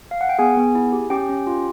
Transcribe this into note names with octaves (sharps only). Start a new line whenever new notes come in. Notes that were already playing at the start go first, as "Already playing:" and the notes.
F5
F#5
G5
B3 G#4 G#5
B3
E4
G4
C#4 G4 G5
C#4
F4